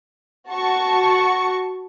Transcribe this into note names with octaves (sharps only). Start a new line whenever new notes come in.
F#4 A5 C#6